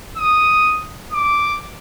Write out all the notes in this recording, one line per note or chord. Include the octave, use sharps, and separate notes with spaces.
D#6
D6